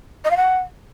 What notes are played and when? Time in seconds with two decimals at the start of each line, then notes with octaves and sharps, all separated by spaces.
0.24 D#5
0.31 F5
0.37 F#5